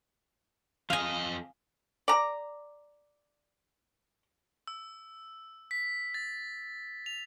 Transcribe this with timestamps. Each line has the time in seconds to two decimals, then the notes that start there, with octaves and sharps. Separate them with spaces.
0.90 F2 D#5 F5 G#5
2.08 D5 A#5
4.67 E6
5.71 B6
6.14 A6
7.06 F7